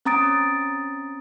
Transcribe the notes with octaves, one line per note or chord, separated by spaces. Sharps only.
C4 C#4 A#5 D#6 A6 D7